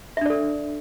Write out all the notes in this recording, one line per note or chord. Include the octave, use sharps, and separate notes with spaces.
D4 A4 D5 E5